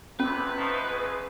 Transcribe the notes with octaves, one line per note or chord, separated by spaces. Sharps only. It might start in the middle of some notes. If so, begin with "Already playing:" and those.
E2 C3 C#4 B4
F3 A3 D#4
C#2 G#4